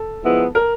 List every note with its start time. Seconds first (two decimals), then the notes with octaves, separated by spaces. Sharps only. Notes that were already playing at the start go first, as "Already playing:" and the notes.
Already playing: A4
0.24 F3 G#3 B3 E4
0.55 A#4